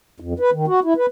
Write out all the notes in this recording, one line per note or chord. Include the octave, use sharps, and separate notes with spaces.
F2
B4
D#3
F#4
E4
B4